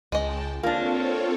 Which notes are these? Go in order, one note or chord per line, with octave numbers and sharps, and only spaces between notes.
C#2 G#3 D#5 G5 A5
A#3 C4 D4 F4 A4 C#5